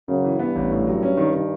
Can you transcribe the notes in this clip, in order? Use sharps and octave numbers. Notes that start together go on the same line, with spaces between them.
F#2 C#3
E3
G2 B3
A1
A2
F#3
C#4
D#3
D#3